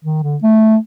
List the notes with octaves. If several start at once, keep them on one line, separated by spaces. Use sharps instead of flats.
D#3
D3
A3